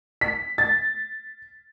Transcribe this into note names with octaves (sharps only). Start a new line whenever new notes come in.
B6
A6